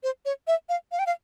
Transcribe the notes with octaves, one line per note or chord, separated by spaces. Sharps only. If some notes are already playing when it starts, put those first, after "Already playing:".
C5
C#5
E5
F5
F5
G5
F5